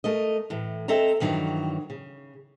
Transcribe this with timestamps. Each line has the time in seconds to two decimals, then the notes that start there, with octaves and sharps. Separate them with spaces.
0.04 A3 A#4 D#5
0.50 A2 E3
0.88 C4 A4 D#5 E5 A#5
1.20 G2 D#3 E3 F#3
1.90 C#3